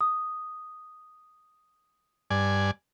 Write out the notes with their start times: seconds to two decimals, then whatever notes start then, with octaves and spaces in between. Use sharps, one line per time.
0.01 D#6
2.30 G2 D5 G#5